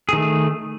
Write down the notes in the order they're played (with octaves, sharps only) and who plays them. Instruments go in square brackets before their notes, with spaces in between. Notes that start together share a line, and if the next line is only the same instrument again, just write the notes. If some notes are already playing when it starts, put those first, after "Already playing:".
[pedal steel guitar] G#4
D#3
A3